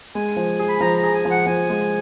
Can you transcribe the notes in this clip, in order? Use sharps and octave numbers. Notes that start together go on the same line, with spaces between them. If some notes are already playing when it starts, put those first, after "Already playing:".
G#3 G#5
F3
G#4
B5
F3 A#5
A#5
G#4
G#5
F3
F#5
F3 G#5
G#3